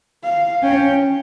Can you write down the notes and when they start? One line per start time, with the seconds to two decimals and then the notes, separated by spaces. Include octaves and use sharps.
0.23 F5
0.63 C#4 G5